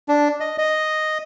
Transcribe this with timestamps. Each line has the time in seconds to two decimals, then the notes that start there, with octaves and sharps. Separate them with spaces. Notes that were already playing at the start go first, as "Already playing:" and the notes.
0.08 D4
0.40 D#5
0.58 D#5